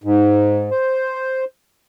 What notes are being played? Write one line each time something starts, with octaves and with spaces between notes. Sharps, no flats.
G#2
C5